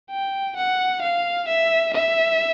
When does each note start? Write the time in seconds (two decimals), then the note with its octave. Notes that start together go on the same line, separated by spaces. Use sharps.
0.11 G5
0.57 F#5
1.02 F5
1.48 E5
1.94 E5